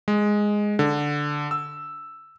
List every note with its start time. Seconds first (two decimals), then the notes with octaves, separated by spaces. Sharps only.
0.08 G#3
0.79 D3
1.51 E6